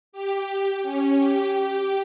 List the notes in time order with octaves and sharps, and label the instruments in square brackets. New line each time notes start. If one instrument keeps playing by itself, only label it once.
[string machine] G4
C#4
G4
G4